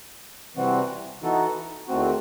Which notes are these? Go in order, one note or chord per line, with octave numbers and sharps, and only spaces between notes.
C3 E3 G3 C4 F#4
E3 B3 D#4 F#4 A4
E2 D#3 A3 C4 F#4